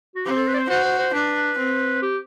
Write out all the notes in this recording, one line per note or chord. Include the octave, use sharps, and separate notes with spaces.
F#4
C4 G4
A4
B4
D5
C5
F#4 C5
C5
C5
D4 B4
C4
G4